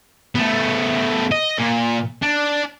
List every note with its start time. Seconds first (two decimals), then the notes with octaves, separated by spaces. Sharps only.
0.35 A3 B3
1.32 D#5
1.59 A#2
2.22 D4